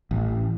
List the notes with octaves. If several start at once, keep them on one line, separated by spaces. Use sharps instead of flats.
A1